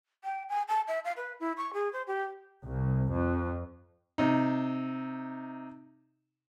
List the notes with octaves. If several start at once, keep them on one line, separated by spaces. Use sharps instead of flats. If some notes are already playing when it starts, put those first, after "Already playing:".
G5
G#5
A5
E5
F5
B4
E4
C#6
G#4
C5
G4
C2
F2
C3 D#4